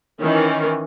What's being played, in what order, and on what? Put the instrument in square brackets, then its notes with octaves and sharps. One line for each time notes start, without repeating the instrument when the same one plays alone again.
[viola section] D#3 E3 C#4